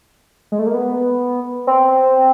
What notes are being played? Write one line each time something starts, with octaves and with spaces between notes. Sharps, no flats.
G#3
A3
A#3
B3
C4